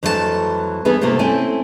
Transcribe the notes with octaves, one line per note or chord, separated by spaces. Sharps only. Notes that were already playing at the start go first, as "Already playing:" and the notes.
F2 E3 F#3 A3 A4 A5
E3 B3 D#4 G#4 B4
C3 A3 A#3 C4 F4 G4
A3 C4 C#4 E4 G#5